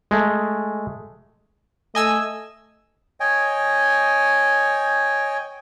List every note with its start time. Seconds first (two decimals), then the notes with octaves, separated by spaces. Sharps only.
0.11 G#3 A3
1.95 A3 D#5 G#5 E6
3.20 C#5 D#5 G5 G#5